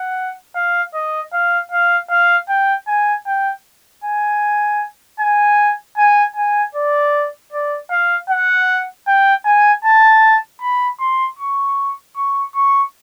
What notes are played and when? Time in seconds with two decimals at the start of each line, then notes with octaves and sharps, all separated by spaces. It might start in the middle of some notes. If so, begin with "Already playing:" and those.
Already playing: F#5
0.56 F5
0.94 D#5
1.33 F5
1.72 F5
2.11 F5
2.49 G5
2.88 G#5
3.26 G5
4.04 G#5
5.20 G#5
5.98 G#5
6.36 G#5
6.75 D5
7.52 D5
7.91 F5
8.30 F#5
9.07 G5
9.46 G#5
9.85 A5
10.62 B5
11.00 C6
11.39 C#6
12.16 C#6
12.55 C#6